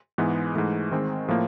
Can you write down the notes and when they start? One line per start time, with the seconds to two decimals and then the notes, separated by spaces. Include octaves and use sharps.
0.18 G#2 E3 G#3 B3
0.55 G#2 E3 A3
0.91 D#3 G#3 C4
1.28 A2 F3 A#3